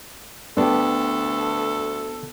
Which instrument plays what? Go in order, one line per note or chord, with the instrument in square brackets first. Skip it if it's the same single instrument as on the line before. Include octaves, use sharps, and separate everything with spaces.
[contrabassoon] D2 [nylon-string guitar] B3 [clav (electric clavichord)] D4 G4 [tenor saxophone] A4